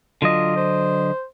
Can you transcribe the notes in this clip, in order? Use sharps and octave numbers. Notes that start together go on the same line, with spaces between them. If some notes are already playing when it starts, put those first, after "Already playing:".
D3 F#3 F4 D#5
C5